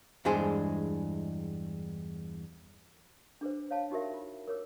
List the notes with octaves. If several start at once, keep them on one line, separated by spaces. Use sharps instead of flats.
E2 G2 G#3 D4 G#4 C5
D4 G#4 B4 C5
C#5 F5 G5 A5
D#4 F#4 G4 A#4 E5
F4
A#4 C#5 D6 E6